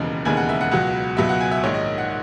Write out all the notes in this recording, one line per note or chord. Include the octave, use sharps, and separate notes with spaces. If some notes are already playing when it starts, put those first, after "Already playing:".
Already playing: E1 D#2 C#3 E3 G#3
E1 D#2 C#3 E3 G#3 G#5
F#5
E5
F#5
C#2 B2 F#3 F#5
C#2 B2 F#3 E5
F#5
G#5
E5
A#1 G#2 D#3 C#5
D#5
F#5